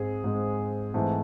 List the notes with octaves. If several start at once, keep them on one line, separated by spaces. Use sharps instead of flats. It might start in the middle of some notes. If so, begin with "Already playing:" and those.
Already playing: G#2 G#3 C4 G#4
G#2 G#3 C4
G#2 E3 A3 C4